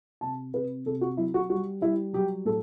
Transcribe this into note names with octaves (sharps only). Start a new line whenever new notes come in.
C3 A5
C3 B4
C3 A4
F#4
F#3 E4
F#4
G3 F#4
G3 E4
F#3 G4
A2 A4